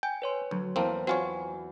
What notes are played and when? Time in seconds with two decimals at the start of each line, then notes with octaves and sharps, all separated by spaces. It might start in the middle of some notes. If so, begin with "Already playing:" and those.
0.03 G5 G#5
0.22 B4 C#5 C6
0.51 D2 F#3
0.76 E2 A#3 C4 C5 A5 D#7
1.07 C4 F4 F#4 C#5 F#5 G#5